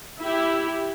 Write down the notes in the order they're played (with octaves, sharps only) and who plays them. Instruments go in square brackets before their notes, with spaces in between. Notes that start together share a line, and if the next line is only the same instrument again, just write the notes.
[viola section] E4 G4